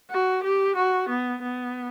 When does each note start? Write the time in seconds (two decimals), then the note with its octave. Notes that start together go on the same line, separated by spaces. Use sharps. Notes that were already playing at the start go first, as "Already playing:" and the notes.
0.11 F#4
0.44 G4
0.76 F#4
1.09 B3
1.42 B3